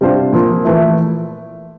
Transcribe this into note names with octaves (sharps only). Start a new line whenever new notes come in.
C3 G3 D4 F4 C5
A#2 F3 A#3
E3 A3 E4